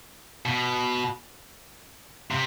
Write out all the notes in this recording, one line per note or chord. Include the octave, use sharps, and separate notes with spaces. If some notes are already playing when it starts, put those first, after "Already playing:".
B2
C3